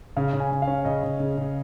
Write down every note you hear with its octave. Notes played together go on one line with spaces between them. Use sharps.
C#3 F5
C#3
G#5
C#3
F5
C#4
C#3 D#5
C#3
C#3
C#3